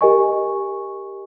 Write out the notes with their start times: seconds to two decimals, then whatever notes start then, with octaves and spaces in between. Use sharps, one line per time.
0.01 G4 A#4 D#5 G#5 C#6